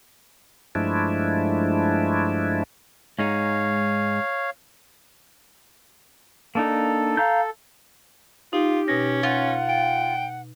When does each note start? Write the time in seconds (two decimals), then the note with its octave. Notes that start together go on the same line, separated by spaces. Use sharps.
0.75 G2 F3 G#3 A3 D4 E4
3.19 G#2 G#3 D#4 C#5 F5
6.55 A#3 D4 D#4 A4
7.17 F5 A#5 G6
8.53 D#4 F4 G4
8.88 B2 C#4 A#6
9.23 F4 F#5
9.69 G5